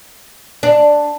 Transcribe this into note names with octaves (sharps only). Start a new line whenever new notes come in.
D4